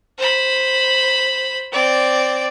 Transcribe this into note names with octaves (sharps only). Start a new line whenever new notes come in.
C5 B5
C4 D5